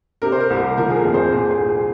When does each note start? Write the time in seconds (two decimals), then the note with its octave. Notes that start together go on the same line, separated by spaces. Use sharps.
0.22 C3 A#4
0.32 C5
0.40 A#4
0.50 C2
0.59 A#4
0.77 F3 A#4
0.90 G#4
0.96 A#4
1.04 F2
1.14 G#4 C5
1.32 A#2 G#4 C5
1.50 G#4 C5
1.60 C2
1.69 G#4